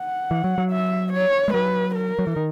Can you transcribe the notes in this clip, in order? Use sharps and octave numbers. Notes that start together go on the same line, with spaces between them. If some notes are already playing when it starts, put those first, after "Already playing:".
Already playing: F#5
E3
F#3
F#3
E5
C#5
G#3
F#3 B4
A#4
F#3
E3
D#3